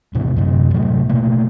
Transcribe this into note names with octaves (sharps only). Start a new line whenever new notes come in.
E2 A2 C3 E3
F#2 C3
A2 C3 F#3 A3
B2 A3 A#3